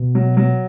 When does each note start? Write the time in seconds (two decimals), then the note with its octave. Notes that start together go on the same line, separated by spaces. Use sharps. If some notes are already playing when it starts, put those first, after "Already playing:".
Already playing: B2
0.15 F#3
0.37 F#3